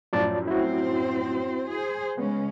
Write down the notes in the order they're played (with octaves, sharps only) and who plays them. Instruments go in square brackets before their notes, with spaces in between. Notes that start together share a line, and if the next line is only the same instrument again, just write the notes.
[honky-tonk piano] F#2 A2 F3 [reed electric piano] F4 D5 A5
[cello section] C4 C5 [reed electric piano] E4 F#4
[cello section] G#4 C5
[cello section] C#3 G#3 C#4 [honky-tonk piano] B3